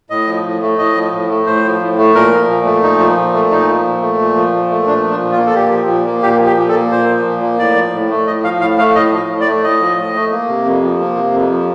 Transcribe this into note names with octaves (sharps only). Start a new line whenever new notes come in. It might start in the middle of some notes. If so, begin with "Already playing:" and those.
A2 D#5
F3
A2
A3
A2 D#5
F3
A2
A3
A2 C5
F3
A2
A3
A#2 A#4
F3
A#2
A3
A#2 D#4
F3
A#2
A3
A#2 D#4
F3
A#2
A3
A#2
F3
A#2
A3
A#2 D4
F3
D4
A#2
F4
A#3
A4
A#2 G4
F3
A#2
A#3
A#2 G4
F3
G4
A#2
A4
A#3
A#2 C5
F3
A#2
A#3
A2 D5
F3
A2
A3
A2 D#5
F3 F5
A2 F5
A3 F5
A2 D#5
F3
A2
D5
A3
A2 D#5
F3
A2
A3
A#3
C3
F2
F3
A#3
C3
F2
F3